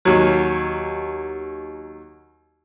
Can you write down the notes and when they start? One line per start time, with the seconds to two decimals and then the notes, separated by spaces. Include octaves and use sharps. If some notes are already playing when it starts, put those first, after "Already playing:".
0.05 D#2 F#3